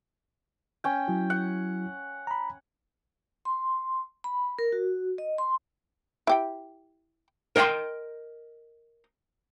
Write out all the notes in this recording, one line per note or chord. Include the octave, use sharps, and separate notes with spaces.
C#4 G5
F#3 E4
F#5
A#5 B5
C6
B5
A#4
F#4
D#5
C6
E4 G4 G5
A#4 D#5 F#5 G5 C6